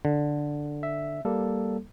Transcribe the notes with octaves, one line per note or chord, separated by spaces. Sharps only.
D3
E5
G3 A#3 A4